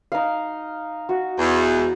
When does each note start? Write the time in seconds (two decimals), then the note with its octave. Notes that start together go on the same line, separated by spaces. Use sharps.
0.12 D#4 F5
1.09 F#4
1.39 E2